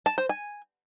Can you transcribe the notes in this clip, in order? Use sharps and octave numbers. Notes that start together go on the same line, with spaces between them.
A5
C5
G#5